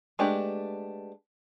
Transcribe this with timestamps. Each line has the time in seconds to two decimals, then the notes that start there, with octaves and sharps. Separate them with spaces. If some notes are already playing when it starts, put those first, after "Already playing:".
0.19 G#3 A3 B3 D4 G4